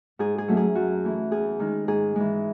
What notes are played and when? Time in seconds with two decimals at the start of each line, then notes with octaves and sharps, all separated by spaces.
0.19 G#2 G#4
0.38 G#4
0.48 F#3 A3 C#4
0.57 G#4
0.75 F#2 F#4
1.04 E3 A3 E4
1.31 E2 G#4
1.60 D#3 G#3 D#4
1.88 G#2 G#4
2.16 E3 G#3